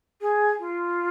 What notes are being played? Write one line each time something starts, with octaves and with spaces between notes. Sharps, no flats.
G#4
F4